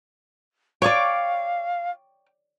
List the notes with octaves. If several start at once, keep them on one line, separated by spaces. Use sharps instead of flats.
C#5 D5 F5 G5 C#6 D6